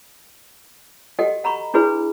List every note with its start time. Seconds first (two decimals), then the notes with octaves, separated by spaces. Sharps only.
1.19 F#4 G4 A4 D#5 F#5 G5
1.44 F#5 A#5 B5 C#6
1.74 D4 E4 F#4 G#4 B4 B5